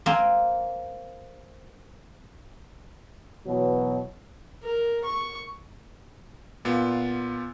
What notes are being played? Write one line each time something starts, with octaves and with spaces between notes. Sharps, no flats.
A#3 C4 G#5
B2 E3 F#3
A#4
C#6
A#2 B3 F4